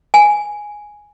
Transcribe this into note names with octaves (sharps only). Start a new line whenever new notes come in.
G#5